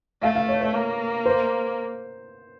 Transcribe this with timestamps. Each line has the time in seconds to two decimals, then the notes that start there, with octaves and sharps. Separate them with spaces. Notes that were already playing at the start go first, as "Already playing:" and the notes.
0.22 A3 F5
0.35 F5
0.49 C#5
0.61 C#5
0.74 A#3
1.26 C5